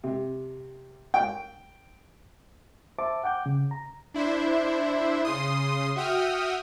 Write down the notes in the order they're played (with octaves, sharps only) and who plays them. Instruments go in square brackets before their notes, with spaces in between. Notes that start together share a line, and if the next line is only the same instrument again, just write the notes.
[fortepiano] C3
G5
[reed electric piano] C5 E5 A5 D6
F#5 G5 D6 G6
C#3
A#5
[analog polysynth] D4 E4 C5 E5
C#3 C6 D#6
F#4 E5 G5 D#6 F6